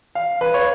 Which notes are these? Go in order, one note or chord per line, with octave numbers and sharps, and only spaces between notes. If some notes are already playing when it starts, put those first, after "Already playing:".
F5
B4
C#5